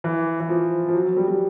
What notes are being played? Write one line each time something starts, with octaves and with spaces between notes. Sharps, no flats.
E3
E3
F3
F3
F#3
F#3
G3
G3